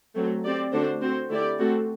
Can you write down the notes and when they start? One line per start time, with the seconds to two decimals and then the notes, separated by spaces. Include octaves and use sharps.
0.15 F#3 A3 C4
0.44 C4 G4 D5
0.72 D3 A3 D4 F#4 C5
1.01 C4 F#4 C5
1.29 D3 A3 E4 G4 D5
1.58 A3 C4 F#4 A4